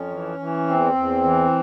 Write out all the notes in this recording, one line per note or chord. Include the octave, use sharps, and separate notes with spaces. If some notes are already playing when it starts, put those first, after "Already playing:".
Already playing: F2 C#4
E3
E3
E2 C4
E2
E3